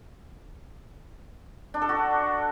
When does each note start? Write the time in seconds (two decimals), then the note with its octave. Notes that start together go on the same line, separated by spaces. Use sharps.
1.74 D4
1.82 A4
1.89 F#4